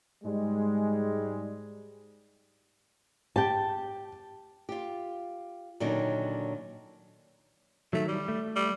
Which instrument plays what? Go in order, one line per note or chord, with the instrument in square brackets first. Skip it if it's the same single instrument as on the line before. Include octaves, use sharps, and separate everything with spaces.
[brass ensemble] G#2 G3 G#3
[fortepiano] G4 [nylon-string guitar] G5 A5
[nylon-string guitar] F4 G4
A#2 D3 D#3 F#3 C#4 D#4
[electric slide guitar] D#3 F#3 [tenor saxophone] A3
[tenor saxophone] G3
[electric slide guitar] A3
[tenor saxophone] G3